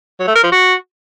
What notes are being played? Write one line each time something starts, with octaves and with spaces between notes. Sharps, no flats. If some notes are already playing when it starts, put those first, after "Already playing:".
F#3
A3
A#4
F3
F#4